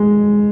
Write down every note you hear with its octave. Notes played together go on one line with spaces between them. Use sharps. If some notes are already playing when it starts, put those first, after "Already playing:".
Already playing: G#3